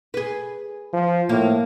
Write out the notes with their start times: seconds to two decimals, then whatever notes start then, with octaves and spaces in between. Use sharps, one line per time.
0.14 G#4 B4
0.93 F3
1.29 A2 A#3